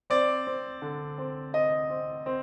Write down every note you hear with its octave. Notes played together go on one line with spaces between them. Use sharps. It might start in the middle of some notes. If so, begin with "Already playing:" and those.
C4 D5
C4
D3
C4
C4 D#5
C4
C4